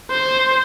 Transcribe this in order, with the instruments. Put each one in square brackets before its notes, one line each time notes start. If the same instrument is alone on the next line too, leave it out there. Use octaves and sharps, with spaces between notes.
[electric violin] C5